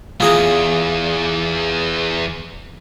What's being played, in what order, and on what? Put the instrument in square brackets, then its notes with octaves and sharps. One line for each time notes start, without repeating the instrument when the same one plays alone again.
[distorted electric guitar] B1 E2 [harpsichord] F4 G#4 A#5